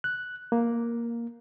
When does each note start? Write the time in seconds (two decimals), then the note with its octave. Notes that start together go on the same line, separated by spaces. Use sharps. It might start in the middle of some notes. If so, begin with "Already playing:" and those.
0.04 F#6
0.52 A#3